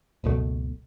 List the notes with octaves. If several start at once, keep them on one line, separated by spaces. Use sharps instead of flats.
F#1 C#2 B2 A3